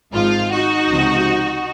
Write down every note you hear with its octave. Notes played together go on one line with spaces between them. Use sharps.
G#1 G#2 F3 F4
D#4 F#4
C#2 C3 F3